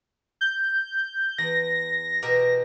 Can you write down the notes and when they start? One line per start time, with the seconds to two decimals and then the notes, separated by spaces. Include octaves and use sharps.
0.41 G6
1.38 E2 A#6
2.22 B2 G4 A#4